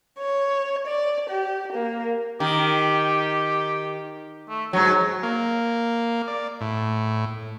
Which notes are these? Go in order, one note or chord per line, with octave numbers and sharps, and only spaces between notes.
C#5
D5
G4
A#3
D#3 G4
A3
G#2 F#3 C#5
A#3
D5
A2